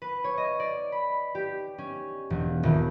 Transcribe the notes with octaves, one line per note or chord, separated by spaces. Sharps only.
B4
C#5
D#5
D5
B5
G4
C#4
E1
D#1